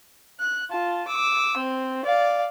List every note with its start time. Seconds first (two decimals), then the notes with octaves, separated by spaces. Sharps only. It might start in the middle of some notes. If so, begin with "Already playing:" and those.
0.40 F#6
0.70 F4 A5
1.07 D6 E6
1.57 C4
2.05 D5 F5